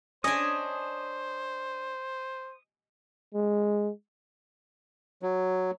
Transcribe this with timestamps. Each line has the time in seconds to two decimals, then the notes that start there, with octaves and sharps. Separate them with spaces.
0.24 C#4 D4 C5 D#5 G#5 D#6
3.34 G#3
5.23 F#3